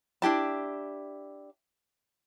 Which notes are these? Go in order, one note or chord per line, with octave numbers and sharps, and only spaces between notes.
D4 E4 G4 A5